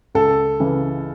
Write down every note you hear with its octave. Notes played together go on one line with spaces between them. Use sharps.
C#2 A4
C#3 E3